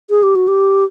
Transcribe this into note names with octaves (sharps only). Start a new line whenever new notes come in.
G#4
G4
F#4
G4